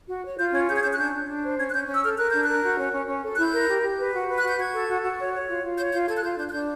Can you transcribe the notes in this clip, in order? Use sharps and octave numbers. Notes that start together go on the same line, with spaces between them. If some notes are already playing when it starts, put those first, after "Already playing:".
F#4
C#5
F4 G6
C#4 G#6
G#4 G6
G#6
C#4 G6
F#6
D4 G6
D4
D4
C5
C#4 G#6
F#6
C#4 G6
C#4
E6
A4 F6
A#4 F#6
D4 G6
F#6
A#4
F#4
C#4
C#4
C#4
A4
F#6
E4 G6
A#4
G4
G4
B4
F#4
B4
F#6
F#4
G6
F#4 G#6
A4
F#4
F#4
C#5
C#5
F4
F4
C#5 G6
F4 G6
A4 G#6
F#6
F4 G6
D4 G6
F#6
D4 G6